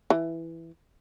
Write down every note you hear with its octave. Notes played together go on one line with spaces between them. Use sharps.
E3